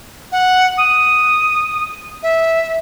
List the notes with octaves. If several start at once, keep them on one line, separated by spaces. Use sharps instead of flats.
F#5
D#6
E5